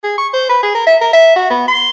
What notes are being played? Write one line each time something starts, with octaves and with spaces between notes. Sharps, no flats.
G#4
C#6
C5
B4
G#4
A#4
E5
A#4
E5
F#4
B3
C6